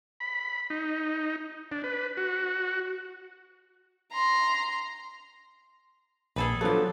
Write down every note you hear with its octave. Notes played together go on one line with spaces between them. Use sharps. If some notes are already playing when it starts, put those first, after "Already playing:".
B5
D#4
D4
B4
F#4
A#5 C6
A#1 G#4 A4 B4
F3 F#3 B3 D4 G4 A4